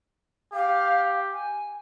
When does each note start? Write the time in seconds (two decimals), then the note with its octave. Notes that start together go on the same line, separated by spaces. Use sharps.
0.54 G4 F5
1.31 G#5